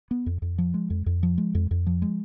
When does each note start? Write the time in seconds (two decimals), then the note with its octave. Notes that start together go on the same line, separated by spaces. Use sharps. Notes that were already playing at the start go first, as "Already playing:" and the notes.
0.11 B3
0.26 F2
0.42 F2
0.58 F3
0.74 G#3
0.90 F2
1.06 F2
1.23 F3
1.38 G#3
1.55 F2
1.71 F2
1.87 F3
2.02 G#3